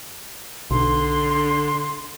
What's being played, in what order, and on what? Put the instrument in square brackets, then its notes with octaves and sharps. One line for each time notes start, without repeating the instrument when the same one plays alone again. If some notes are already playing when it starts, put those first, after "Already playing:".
[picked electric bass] B1 [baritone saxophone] D3 [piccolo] C6